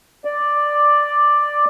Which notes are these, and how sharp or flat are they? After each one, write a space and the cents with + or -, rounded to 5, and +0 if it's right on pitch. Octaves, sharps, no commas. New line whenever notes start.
D5 +5